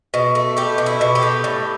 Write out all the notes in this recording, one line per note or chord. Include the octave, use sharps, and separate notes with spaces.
B2
A3
A3 G4
B2
E4
B2
G4
A3
A2